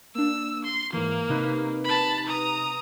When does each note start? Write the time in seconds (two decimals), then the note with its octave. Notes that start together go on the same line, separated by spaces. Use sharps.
0.15 A#3 D4 E6
0.65 C6
0.93 G#2 E3 A#3
1.29 C3 D#4 B4
1.84 A5 B5
2.26 A#5 D#6